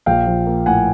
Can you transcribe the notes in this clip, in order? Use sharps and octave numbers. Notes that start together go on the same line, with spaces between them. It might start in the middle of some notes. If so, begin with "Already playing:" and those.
A#1 F5 G5
F3
A#3
A2 F#5 G#5